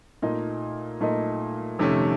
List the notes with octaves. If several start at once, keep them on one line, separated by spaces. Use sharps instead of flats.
A#2 A3 D#4 A#4 D#5
A#2 A3 D#4 A#4 D#5
F2 C3 D#3 A3 C#4